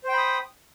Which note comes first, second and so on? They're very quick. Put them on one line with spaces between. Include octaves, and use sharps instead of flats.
C5 G5 B5 D#6